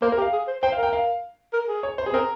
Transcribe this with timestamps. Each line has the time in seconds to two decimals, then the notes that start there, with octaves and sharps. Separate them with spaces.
0.02 A#3 C5
0.12 A#4
0.17 G4
0.22 F5
0.32 G#4
0.47 C5
0.63 C5 G5
0.72 F5
0.77 A#4
0.83 G5
0.93 F5
1.53 A#4
1.68 G#4
1.83 C#5
1.98 C5
2.06 G#4
2.13 C4 A#4